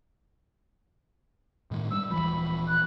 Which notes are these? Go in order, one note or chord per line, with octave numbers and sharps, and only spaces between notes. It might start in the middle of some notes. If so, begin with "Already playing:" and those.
A2 D#3 G#3
G3 E6
D#1 E3 F3 B5
F#6